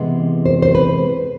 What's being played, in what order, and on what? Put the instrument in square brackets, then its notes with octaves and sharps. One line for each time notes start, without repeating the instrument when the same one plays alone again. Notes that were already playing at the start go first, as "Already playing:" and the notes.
Already playing: [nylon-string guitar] C3 E3 G#3 B3
C5
C5
B4